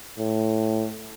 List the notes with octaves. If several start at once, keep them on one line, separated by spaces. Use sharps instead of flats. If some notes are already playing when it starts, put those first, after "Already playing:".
A2